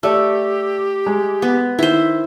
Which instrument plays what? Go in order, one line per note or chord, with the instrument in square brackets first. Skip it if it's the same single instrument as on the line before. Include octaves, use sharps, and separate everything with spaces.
[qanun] A3 [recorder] G4 [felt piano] D5 E6
[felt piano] G#3
[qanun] B3
[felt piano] D#3 [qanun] E4 C5